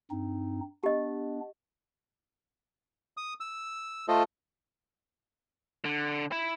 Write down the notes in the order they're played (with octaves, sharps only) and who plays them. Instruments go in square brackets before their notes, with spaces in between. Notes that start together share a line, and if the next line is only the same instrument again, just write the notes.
[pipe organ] G2 C4 D#4
[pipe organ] B3 D4 [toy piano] G4 D#5
[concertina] D#6
E6
A3 F4 A4 C5 D#5
[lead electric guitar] D3
E4